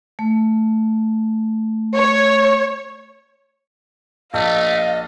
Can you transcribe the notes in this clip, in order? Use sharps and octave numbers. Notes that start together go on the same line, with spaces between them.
A3
C#5
A#1 A3 D#5 F5